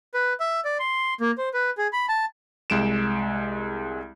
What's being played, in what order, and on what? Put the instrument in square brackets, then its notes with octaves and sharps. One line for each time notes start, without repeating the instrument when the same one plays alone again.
[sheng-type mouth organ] B4
E5
D5
C6
A#3
C5
B4
G#4
B5
A5
[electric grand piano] C2 G#3 D7 E7